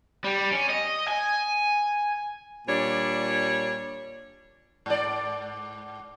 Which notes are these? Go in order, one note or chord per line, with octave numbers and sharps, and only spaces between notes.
G3
C#4
D#5
G#5
A#2 G3 D4 C#5
G#2 D5